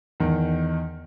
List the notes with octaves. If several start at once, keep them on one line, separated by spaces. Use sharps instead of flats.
E2 D#3